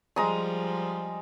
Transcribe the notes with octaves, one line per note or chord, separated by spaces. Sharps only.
F3 G3 G#3 A#5 D#6